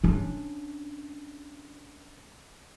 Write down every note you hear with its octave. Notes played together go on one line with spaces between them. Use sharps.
C#4 D4